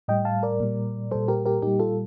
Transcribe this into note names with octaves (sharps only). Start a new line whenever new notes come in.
A2 G3 D#5 G5
F5 A5
A#4 D5
A#2 G3
A#2 G3 A4 C5
G4 A#4
G4 A#4
A#2 G3 D#4 G4
F4 A4